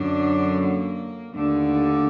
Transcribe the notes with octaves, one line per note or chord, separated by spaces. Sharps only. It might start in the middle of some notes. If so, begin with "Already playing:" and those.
Already playing: F#2 D3 D4
A#3
D#2 D3 A3